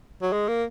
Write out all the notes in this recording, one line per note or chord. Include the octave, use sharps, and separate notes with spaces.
F#3
G#3
A#3